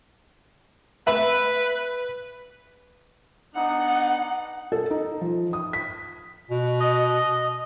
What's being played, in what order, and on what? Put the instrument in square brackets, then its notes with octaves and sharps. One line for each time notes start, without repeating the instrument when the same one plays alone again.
[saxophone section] B4 [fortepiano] E5 B5
[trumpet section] B3 D4 D#4 [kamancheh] F#5
[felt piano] A4
D#4
F3
D#6
B6
[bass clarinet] B2
[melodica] D#5